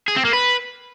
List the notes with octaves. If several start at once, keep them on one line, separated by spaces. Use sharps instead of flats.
G#4
C4
A#3
B4